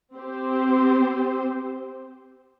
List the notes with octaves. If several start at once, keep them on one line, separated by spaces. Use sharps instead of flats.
C4 G4 C5